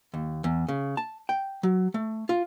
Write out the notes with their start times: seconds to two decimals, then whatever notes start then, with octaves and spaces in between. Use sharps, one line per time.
0.14 D#2
0.44 E2
0.68 C#3
0.97 A5
1.29 G5
1.63 F#3
1.94 A3
2.29 F4